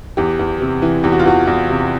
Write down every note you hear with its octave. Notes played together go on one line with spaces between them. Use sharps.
E2 G4
E2
C3
E3
E2 G4
F#4
F4
E2 F#4
E2
C3